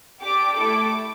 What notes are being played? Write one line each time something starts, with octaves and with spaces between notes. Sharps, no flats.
D4 G4 D6
A3 E4 A4 D6